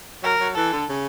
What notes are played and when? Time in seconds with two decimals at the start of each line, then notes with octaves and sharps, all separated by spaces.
0.23 F#3 A#4
0.40 F#3
0.56 E3 A4
0.73 D3
0.89 C#3